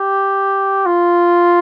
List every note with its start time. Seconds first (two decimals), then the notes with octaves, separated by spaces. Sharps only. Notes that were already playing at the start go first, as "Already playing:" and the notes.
Already playing: G4
0.86 F4